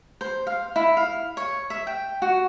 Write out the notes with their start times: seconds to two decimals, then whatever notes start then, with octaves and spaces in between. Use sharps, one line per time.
0.21 C5
0.47 F5
0.76 E4
0.97 F5
1.37 C#5
1.70 E5
1.87 G5
2.22 F#4